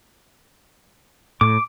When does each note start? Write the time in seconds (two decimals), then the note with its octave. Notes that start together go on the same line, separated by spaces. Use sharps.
1.41 A2 D6